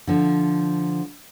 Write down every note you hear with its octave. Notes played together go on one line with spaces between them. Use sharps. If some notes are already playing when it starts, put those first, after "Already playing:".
D3 F3